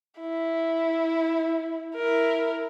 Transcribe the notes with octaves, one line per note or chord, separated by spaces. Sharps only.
E4
E4 A#4